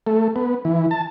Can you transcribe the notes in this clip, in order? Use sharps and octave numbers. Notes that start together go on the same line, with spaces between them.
A3
B3
E3
A5